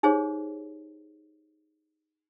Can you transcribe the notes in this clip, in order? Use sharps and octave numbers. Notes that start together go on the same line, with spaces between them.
D#4 G4 G#4 C5 C#5